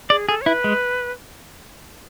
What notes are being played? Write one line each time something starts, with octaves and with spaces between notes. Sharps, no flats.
G#4 D5
G#4 A4
C#5
E4 B4
G#3